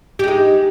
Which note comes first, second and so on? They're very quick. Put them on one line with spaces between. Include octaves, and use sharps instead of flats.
G4 G#3 D#4